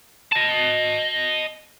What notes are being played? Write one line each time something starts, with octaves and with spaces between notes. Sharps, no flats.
D#5 A5